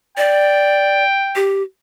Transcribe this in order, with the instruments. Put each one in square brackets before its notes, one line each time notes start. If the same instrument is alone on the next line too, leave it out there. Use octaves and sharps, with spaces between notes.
[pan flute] D5 [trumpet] G5
[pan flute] G4